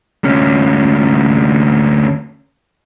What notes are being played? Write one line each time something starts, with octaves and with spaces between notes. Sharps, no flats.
D2 C#4